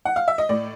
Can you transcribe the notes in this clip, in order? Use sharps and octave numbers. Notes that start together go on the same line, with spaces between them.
F#5
F5
E5
D#5
A2 D5